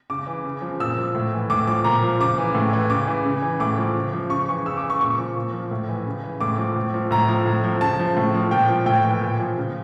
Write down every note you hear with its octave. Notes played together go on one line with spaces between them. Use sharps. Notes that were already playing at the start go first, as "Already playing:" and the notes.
C#3 D6
E3
C#3
F3
A#2 E6
F3
A2
E3
A2 D6
F3 D6
A#2 A#5
F3
C#3 D6
E3
A2
E3
C#3 D6
E3
C#3
E3
A2 D6
F3
C#3
F3
C#3 C#6
E3 C#6
C#3 E6
D6
E3
C#6
A#2 C#6
F3
A#2
F3
A2
E3
C#3
E3
A2 D6
F3
A2
F3
A2 A#5
F3
A2
F3
C#3 A5
F3
A2
F3
A#2 G5
F3
A2 G5
E3
A#2
F3
C#3